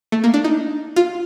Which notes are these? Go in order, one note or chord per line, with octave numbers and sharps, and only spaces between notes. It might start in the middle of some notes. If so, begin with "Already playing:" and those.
A3
A#3
D4
D#4
F4